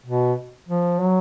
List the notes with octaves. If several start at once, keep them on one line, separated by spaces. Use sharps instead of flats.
B2
F3
F#3